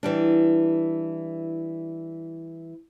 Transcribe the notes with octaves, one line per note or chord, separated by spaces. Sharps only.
E3 G3 D4